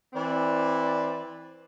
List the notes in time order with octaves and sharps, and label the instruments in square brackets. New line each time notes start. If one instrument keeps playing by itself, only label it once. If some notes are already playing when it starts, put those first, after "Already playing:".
[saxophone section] E3 C4 D5